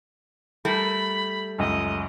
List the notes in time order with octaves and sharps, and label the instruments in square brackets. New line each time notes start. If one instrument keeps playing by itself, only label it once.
[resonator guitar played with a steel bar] G3 A3 A#4 [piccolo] B5
[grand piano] C#2 F#2 [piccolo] D#5